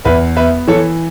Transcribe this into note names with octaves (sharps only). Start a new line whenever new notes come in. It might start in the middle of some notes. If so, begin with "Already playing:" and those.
E2 B4 E5
B3 B4 E5
E3 A4 C#5